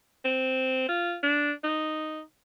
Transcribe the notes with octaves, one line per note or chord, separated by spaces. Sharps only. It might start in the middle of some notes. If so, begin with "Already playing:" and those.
C4
F4
D4
D#4